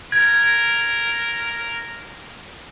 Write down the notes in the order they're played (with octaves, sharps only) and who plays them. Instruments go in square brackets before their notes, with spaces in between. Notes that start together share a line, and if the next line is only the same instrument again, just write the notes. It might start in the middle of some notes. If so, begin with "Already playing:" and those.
[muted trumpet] A#4 [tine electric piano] G#6